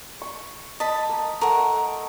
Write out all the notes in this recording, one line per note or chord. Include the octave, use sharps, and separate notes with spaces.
C#6
D#5 A5 B5
A#3
A3 A#4 F#5